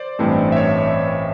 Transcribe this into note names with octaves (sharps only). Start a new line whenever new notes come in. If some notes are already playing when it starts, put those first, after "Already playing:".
Already playing: C5 D5
A1 G2 E3 A3 C4
E5
C#5